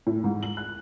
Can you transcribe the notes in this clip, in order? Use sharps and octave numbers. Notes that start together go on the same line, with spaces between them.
A2
G#2
F#7
F#6